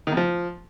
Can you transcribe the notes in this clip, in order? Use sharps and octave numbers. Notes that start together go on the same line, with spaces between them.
D#3
F2
F3